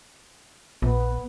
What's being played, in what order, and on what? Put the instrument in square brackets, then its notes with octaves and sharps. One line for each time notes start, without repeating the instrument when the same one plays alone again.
[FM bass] A#1 [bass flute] B3